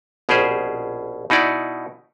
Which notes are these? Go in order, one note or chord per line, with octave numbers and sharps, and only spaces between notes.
A#1 B2 C#4 G4 G#4 C5
B2 D#4 E4 D5 F#5